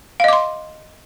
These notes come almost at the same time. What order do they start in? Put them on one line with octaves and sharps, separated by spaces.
F5 D#5 D6 C6